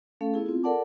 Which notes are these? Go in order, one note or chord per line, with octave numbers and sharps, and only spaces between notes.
A3 C#4 A4 F5
B3 E4 G#4
C4 F4
A4 A#4 D5 F#5 A5 D6